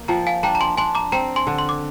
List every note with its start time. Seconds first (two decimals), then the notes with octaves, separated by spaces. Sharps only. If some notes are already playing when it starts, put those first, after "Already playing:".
Already playing: A#3
0.08 F3 G5 A#5
0.27 F5 G#5
0.43 D4 G5 A#5
0.55 A#5
0.61 G#5 C6
0.78 D4 G#5 C6
0.95 A#5 D6
1.12 C4 G5 A#5
1.36 G#5 C6
1.47 D3
1.59 C6
1.69 D6